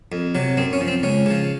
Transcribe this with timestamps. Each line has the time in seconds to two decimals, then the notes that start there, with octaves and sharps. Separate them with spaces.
0.12 F2
0.35 C3 F#3
0.57 F#2 C4
0.73 C#4
0.81 F3
0.88 C4
1.03 C#2 C#4
1.26 C#3 F3